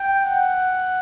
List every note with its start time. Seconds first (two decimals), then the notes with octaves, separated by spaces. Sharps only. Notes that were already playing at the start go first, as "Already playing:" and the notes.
Already playing: G5
0.25 F#5